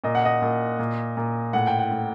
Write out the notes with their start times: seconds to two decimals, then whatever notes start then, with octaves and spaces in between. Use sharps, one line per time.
0.04 A#2 D#5
0.15 F#5
0.25 D#5
0.42 A#2
0.79 A#2
1.17 A#2
1.53 A2 F#5
1.67 G5
1.79 F#5
1.91 A2